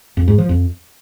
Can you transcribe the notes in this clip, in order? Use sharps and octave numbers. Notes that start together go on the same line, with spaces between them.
F2
G#2
F3
F2